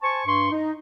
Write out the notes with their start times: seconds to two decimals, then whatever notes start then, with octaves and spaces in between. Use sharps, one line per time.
0.02 C5 G#5 A5 C#6
0.25 G2 C6 C#6
0.51 D#4